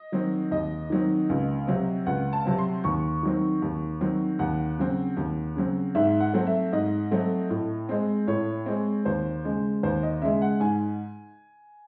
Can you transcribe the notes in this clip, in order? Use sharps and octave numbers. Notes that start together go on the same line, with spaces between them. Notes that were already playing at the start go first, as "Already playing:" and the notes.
Already playing: D#5
D#3 F#3 C4
D#2 D#5
D#3 F#3 C4
C#2
C3 F#3 C4
C#2 F#5
A5
C3 F#3 C4
C6
D#2 C#6
D#3 F#3 C4
D#2
D#3 F#3 C4
D#2 F#5
C#3 F#3 C4
D#2
C#3 F#3 C4
G#2 E5
F#5
F#3 A3 C4
E5
G#2 D#5
F#3 A3 C4
A2
G#3 C4
A2 C#5
G#3 C4
D#2 C5
C#3 G#3
D#2 C5
D#5
C#3 G#3 E5
F#5
G#2 G#5